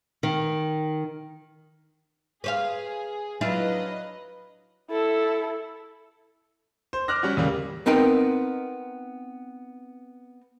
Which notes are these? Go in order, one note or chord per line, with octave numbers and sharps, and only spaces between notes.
D#3
G#4 B4 C5 F5
F#3 D4 E4 F4 B4 D#5
E4 A4
C5
D6 F6 F#6 A#6
G3 C#4 F#4
D#2 C#3 G3 A#3
B3 C4 D#4 A#4 G5